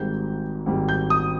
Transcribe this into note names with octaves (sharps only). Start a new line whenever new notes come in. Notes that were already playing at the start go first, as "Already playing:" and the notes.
Already playing: G#1 G#2 G3 G6
G#1 G#2 G3
G6
D#6